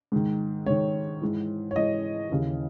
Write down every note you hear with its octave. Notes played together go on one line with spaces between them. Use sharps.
G#2 D#3
G#2 D#3 C#5
G#2 E3
C#5
G#2 E3 D#5
D#2 C#3 E3